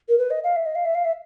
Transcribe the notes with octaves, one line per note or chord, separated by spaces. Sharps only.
A#4
B4
D#5
F5
E5
D#5
F5
E5
F5
E5